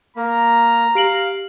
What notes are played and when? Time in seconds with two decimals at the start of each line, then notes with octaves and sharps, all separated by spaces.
0.17 A#3 A#5
0.95 G4 F5 D7 F#7